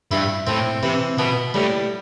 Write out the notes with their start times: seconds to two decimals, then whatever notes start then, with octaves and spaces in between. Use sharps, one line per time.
0.11 G2 E4
0.47 A2 C4
0.83 C3 E3
1.18 B2 B3
1.54 A2 G3